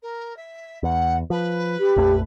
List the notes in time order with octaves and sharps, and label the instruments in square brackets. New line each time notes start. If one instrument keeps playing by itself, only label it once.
[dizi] A#4
E5
[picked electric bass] E2 [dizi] F#5
[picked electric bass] F3 [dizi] B4
[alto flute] G4
[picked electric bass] A#1 F2 A3